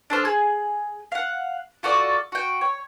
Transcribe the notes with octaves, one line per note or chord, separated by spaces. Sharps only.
D4 A4 C5 F6
G#4
F5 F#5
F4 F#4 A4 D5
F#4 G5
C#5